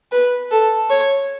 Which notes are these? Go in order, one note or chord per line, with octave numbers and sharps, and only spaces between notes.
B4
A4
C#5